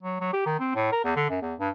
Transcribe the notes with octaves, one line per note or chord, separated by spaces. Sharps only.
F#3
F#3
G4
D#3
C4
A2
A#4
E2
D3
F#2
E2
G2